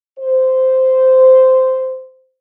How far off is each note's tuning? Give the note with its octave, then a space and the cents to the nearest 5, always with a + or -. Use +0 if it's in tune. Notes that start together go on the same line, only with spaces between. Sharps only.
C5 -10